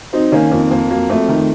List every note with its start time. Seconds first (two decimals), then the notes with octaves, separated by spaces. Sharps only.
0.13 F#3 C4 D#4
0.32 D#3 A#3 C#4
0.52 F2 A#3
0.71 F2 A#3
0.90 F#3 A#3
1.10 F2 A3
1.29 D#3 A3